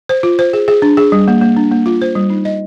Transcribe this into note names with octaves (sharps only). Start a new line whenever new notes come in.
C5
F4
C5
G#4
G#4
D4
G#4
G3
A#3
A#3
D4
A#3
F4
C5
G3
D#4
D#5